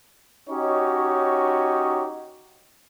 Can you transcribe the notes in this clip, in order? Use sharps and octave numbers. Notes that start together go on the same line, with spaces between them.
C#4 D#4 F#4 G4 C#5 D#5